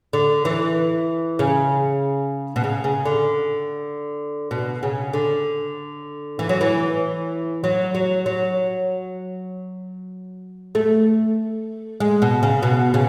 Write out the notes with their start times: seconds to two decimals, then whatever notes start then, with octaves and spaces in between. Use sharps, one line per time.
0.13 D3
0.45 E3
1.39 C#3
2.56 B2
2.64 C#3
2.84 C#3
3.05 D3
4.51 B2
4.83 C#3
5.13 D3
6.39 E3
6.49 F#3
6.61 E3
7.64 F#3
7.95 F#3
8.26 F#3
10.75 A3
12.00 G#3
12.22 B2
12.43 C#3
12.62 B2
12.94 C#3